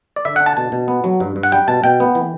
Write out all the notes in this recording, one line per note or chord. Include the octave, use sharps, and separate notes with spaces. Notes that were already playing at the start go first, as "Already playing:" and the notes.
D5
D3 E5
D4 F#5
A5
B2 A5
B2
B3
F#3
G2
G2
F#5
G3 G5
B2 A5
B2 G5
B3
E3